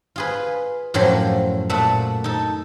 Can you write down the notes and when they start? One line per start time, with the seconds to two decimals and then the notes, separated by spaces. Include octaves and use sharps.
0.16 F4 G#4 B4
0.94 F#2 A2 F3 F#3 G4 C6
1.70 A#2 A3 A4 F#5
2.24 D#4 A4